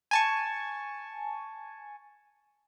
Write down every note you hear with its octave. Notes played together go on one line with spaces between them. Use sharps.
G#5 A5 C#6